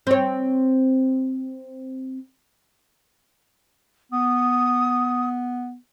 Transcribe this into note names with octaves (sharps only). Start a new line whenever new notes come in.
C4 C#5
B3 D#6